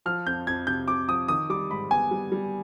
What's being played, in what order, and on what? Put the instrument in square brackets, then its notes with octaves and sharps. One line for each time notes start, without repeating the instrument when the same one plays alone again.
[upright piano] F3 [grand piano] F6
[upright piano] F2 [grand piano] G6
[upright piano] F2 [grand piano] G#6
[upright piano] C3 [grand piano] G6
[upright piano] C3 [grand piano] D6
[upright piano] F3 [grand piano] D#6
[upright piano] D#3 [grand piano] D#6
[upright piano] G3 [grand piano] D6
[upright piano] G#2 [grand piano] B5
[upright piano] B3 [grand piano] G#5
[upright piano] G3
G3